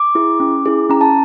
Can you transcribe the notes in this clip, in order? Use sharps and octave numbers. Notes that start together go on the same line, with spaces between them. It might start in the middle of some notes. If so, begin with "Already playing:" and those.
Already playing: D6
E4 G#4
C#4
E4 G#4
C#4 A#5
A5